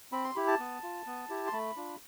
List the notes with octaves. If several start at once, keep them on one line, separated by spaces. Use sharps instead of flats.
C4 B5
C6
E4 G4 B5
A5
B3
F4
B3
E4 G4
C6
A3 B5
D4 F4